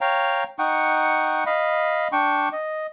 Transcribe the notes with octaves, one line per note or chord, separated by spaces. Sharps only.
C#5 F5 G5 A#5
D#4 F#5 G5 C#6
D#5 F5 B5
D4 G5 C#6
D#5